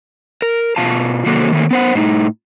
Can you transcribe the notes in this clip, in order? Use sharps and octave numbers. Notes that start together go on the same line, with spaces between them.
A#4
B2 F4 F5 A5
C3 D#3 F#3 A#3 F#4 A4
D#3 A3 A#3
B3 C5 F#5
A2 D#4